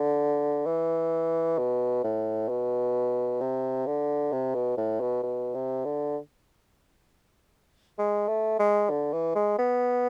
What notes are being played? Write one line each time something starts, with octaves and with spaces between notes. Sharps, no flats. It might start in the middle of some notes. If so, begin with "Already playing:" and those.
Already playing: D3
E3
B2
A2
B2
C3
D3
C3
B2
A2
B2
B2
C3
D3
G#3
A3
G#3
D3
E3
G#3
B3